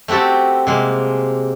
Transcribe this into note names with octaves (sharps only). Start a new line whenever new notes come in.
A3 C4 F#4 G4 A4
C3 G#3 A#3